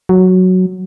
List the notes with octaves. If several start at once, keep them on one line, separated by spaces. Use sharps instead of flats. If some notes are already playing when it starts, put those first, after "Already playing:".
F#3